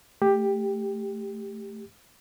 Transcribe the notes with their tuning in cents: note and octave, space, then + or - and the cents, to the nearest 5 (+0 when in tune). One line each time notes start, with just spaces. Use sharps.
A3 +0 G4 +10